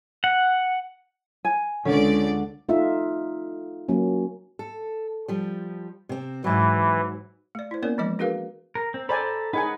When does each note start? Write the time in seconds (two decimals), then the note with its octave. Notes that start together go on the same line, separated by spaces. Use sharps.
0.24 F#5
1.45 G#5
1.85 C#2 D3 C#4 D5
2.69 A3 D#4 F4 E5
3.89 F#3 A#3 C#4
4.59 A4
5.28 F3 G3
6.09 C3 C4
6.44 G#2 E3 F#3
7.55 A3 D5
7.71 E4 C5
7.83 A#3 B3 C#4 A#4 C#5 D5
7.98 E3 F3 G#3 D#5 D6
8.19 D4 F#4 G#4 A#4 B4 F5
8.75 A#4
8.94 C4
9.09 A4 C5 D5 G#5 A#5 B5
9.53 D#4 G#4 B4 C#5 F#5 G#5